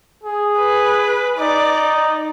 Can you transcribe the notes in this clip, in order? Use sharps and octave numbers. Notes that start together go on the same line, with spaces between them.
G#4
B4
D#4 D5